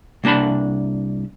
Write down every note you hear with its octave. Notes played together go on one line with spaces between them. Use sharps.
C2 A#3 D4 A5 B5